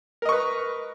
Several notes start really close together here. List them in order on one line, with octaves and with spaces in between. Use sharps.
A#4 D#5 C#6 B4